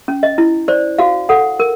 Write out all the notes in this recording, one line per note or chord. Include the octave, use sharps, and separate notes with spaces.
C#4
D#5
E4
C5 D5
F#4 F5
A4 F#5
A#4